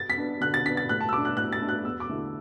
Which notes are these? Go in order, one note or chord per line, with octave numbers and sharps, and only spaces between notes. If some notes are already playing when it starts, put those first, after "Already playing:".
Already playing: A6
B6
B3 D4
D3 F#6
A6
B3 D4 B6
A6
A2 F#6
A5
E6
A3 D4 D6
F#6
A2 F#6
A6
A3 D4
F#6
E2 E6
D6
D3 A3 E4